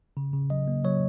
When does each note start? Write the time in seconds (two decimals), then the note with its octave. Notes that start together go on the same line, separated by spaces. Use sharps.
0.17 C#3
0.34 C#3
0.50 F#3 D#5
0.68 A#3
0.85 F#3 C#5